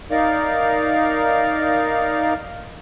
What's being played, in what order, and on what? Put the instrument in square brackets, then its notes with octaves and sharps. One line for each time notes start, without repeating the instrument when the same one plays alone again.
[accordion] D#4 A#4 D5 F5